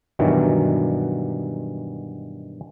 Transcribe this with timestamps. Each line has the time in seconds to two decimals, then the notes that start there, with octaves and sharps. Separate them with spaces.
0.19 G2 B2 D#3 E3 F#3